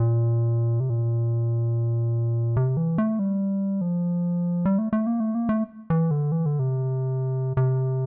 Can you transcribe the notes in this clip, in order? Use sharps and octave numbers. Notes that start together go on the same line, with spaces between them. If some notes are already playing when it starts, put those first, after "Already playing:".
Already playing: A#2
C3
A#2
C3
E3
A3
G3
F3
G3
A3
A3
A#3
A3
A#3
A3
E3
D3
E3
D3
C3
C3